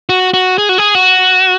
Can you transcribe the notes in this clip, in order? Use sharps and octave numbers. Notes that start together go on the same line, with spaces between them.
F#4
F#4
G#4
F#4
G#4
F#4